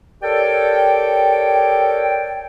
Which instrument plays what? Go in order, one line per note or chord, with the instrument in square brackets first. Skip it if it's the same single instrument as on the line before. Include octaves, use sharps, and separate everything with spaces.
[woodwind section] G4 A4 A#4 C#5 D5 G5